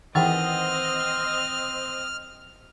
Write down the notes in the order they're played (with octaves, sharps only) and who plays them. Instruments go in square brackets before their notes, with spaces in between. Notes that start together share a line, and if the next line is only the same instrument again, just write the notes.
[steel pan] D#3 E3 [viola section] C4 D#5 [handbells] F#5 G5 A6 [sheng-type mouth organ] F6